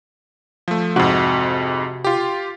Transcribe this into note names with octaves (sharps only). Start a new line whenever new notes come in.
F3 A3
F2 G#2 C3 F#4
F4 G4